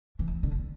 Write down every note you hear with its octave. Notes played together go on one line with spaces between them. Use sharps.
E3
D3